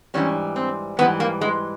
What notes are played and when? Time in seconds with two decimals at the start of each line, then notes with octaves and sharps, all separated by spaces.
0.14 G#2 E3 G3 C#4
0.56 C4
0.99 G#2 E3 G3 B3
1.20 A#3
1.41 G#3